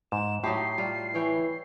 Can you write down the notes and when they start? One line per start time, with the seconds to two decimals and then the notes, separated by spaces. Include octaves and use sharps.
0.12 G#2 E7
0.44 A2 F#3 D#4 G4 C7
0.78 G3 F4
1.14 E3 E4 C#5 G5